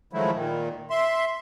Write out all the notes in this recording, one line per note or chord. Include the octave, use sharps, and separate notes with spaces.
D#3 F3 F#3 G#3 A3 E4
A#2 D#3
E5 C6